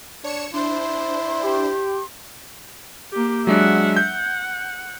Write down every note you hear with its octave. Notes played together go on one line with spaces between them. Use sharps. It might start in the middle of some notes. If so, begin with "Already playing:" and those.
D4 C#5 C#7 E7
D4 E4 C5 C6
G4
A#3 G4
F#3 G#3 D4 E5 F#5
F#5 G6